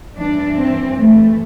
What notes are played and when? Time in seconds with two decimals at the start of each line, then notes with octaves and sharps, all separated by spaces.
0.16 G2 E3 D4
0.57 C4
0.98 A3